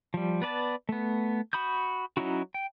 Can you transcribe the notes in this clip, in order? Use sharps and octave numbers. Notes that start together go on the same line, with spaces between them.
F3 G3
B3 B4 D5 A5
A3 B3
F#4 B5 D#6 G6
F#3 C#4 D#4 E4 F#4
G5